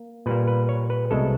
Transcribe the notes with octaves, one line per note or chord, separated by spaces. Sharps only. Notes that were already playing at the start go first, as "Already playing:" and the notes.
Already playing: A#3
A#2 G3 A#3 B4
B4
C#5
B4
C2 B2 G#3 A4